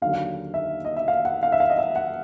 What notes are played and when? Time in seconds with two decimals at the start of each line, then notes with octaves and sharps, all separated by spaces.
0.02 D#2 D3 F#3 F5
0.54 E5
0.85 D#5
0.96 E5
1.08 F5
1.25 F#5
1.43 F5
1.52 E5
1.60 F5
1.70 D#5
1.78 E5
1.96 F#5